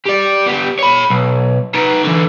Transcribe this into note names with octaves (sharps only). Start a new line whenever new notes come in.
G4 D5
B3 G4
C#5 B5
B1
D#4 B4
D3 E3